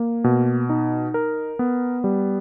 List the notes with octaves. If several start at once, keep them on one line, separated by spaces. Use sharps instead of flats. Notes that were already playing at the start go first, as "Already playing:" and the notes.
Already playing: A#3
B2
D#4
A#4
B3
G3